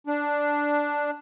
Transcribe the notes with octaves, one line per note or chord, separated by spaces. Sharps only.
D4